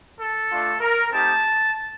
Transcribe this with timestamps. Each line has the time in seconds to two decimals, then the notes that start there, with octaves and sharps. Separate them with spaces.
0.20 A4
0.51 A3 D4 F4
0.81 A#4
1.11 A3 C4 D#4 G4 A5